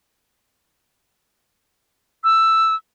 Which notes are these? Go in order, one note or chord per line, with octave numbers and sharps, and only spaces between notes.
E6